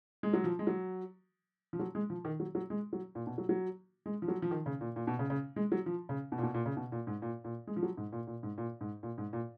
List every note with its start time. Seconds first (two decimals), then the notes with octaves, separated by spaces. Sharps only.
0.23 G#3
0.33 F#3
0.44 F3
0.59 G#3
0.67 F#3
1.73 F3
1.79 F#3
1.95 G#3
2.10 F3
2.25 D#3
2.40 F#3
2.55 F#3
2.70 G#3
2.93 F#3
3.15 A#2
3.27 B2
3.38 F#3
3.49 F#3
4.06 G#3
4.22 F3
4.28 F#3
4.42 F3
4.51 D#3
4.66 C#3
4.81 A#2
4.96 A#2
5.07 B2
5.19 C#3
5.30 C#3
5.56 G#3
5.72 F#3
5.86 F3
6.09 C#3
6.32 B2
6.38 A#2
6.43 B2
6.54 A#2
6.66 C#3
6.77 B2
6.92 A#2
7.07 G#2
7.22 A#2
7.44 A#2
7.67 G#3
7.76 F3
7.83 F#3
7.97 G#2
8.13 A#2
8.27 A#2
8.43 G#2
8.58 A#2
8.81 G#2
9.03 A#2
9.18 G#2
9.33 A#2